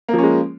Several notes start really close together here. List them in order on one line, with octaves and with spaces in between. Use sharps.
A#3 F3 C#4 G#3